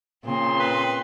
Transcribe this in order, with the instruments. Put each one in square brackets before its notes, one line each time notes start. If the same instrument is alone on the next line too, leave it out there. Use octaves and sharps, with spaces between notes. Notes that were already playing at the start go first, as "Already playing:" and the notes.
[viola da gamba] A#2 C#3 [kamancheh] C4 C6
[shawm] B4